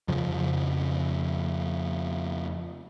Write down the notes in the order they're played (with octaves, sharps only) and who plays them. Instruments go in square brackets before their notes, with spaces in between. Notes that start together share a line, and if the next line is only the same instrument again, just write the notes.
[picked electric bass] F2 C#3 F3